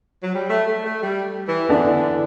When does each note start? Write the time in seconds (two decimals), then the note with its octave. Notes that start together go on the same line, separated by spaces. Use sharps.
0.22 F#3
0.34 G3
0.50 A3
0.67 A3
0.84 A3
1.01 G3
1.47 E3
1.69 D3 E3 B3 D4
1.92 D3